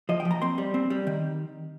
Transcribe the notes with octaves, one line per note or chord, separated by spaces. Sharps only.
F3 D#5
G5
F3
A#5
C4 C6
G3
C4
G3
D#3